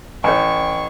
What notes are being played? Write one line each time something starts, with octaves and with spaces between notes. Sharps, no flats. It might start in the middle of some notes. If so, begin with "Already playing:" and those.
A1 C#5 G5 G#5 C#6